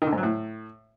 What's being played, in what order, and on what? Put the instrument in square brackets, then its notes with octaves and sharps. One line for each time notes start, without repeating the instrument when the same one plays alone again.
[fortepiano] D#3
D3
G#2
F#3
A2